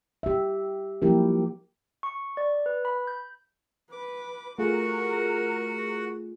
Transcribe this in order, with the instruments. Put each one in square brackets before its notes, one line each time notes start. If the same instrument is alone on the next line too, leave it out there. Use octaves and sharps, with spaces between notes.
[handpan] G4 E5
F3 F#3 A#3 E4 G4 A#4
[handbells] C#6
D5
B4
B5
G6
[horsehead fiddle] B4 [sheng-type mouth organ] D6
[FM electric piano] A3 F4 G#4 [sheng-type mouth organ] F#4 F#5 [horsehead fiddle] A#4